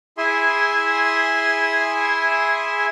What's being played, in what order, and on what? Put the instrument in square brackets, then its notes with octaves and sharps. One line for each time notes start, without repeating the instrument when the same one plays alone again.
[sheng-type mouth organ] E4 G#4 E5 G#5 C6